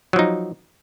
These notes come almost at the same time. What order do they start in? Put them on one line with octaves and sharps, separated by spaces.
F#3 F3 D#4